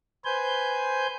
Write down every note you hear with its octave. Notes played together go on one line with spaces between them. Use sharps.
B4 C5 G#5 G6